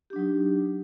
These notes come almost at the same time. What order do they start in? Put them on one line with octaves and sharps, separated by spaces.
G4 D4 F#3 D#4